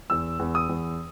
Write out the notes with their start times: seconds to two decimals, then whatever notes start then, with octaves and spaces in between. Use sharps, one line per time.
0.10 E2 E6
0.39 E2
0.55 D#6
0.69 E2